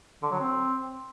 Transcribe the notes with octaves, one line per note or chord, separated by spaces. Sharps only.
D3
F#3
C4